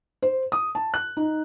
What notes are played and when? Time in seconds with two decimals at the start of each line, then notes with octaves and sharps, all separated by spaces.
0.22 C5
0.52 D#6
0.75 A5
0.94 F#6
1.17 D#4